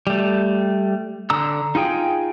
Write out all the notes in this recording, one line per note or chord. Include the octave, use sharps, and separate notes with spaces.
G3 A3
D3 A#5 E6
D#4 F4 G#4 G5